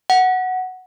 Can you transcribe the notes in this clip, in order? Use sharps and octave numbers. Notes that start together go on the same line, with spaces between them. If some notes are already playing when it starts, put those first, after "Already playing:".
F#5